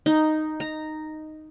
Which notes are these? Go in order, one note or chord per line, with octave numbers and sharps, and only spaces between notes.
D#4
A#5